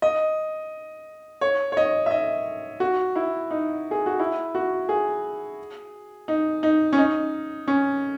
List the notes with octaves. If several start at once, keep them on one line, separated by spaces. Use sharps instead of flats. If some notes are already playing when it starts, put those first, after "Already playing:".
D#5
C#5
C#5
D#5
E5
D#5
F#4
E4
D#4
G#4
F#4
E4
F#4
G#4
D#4
D#4
C#4
D#4
C#4